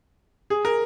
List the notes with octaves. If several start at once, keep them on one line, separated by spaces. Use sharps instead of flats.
G#4
A#4